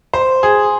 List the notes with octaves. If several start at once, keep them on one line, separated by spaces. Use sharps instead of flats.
C5
G#4